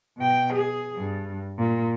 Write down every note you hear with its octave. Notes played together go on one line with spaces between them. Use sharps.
B2 G5
G#4
G2
A#2